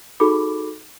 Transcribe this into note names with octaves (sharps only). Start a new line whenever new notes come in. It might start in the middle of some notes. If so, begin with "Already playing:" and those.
D#4 F#4 G#4 A4 B5 D6